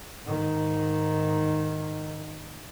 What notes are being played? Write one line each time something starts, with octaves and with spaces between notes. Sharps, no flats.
G#2 D#3